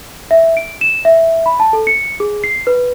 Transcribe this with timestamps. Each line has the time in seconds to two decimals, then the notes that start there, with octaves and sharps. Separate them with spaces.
0.31 E5
0.57 D7
0.81 E7
1.05 E5
1.46 B5
1.60 A5
1.73 A4
1.87 C#7
2.20 G#4
2.44 C7
2.67 B4